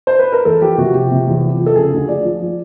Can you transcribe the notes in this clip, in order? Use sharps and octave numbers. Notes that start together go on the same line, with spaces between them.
C5
B4
A#4
E2 A4
F3 G4
C3 F#4
F3 G4
C3
E2
F3
F3
A4
C#3 G#4
D2
F3 D5
F3
F3